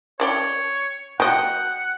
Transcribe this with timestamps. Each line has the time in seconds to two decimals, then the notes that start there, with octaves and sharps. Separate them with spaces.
0.20 C#4 C#5 D5 G5
1.20 F#3 D#5 F#5 G5